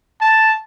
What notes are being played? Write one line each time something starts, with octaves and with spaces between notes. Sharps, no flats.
A5